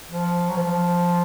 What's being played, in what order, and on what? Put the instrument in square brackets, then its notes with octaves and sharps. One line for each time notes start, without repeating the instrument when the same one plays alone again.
[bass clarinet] F3
F#3
F3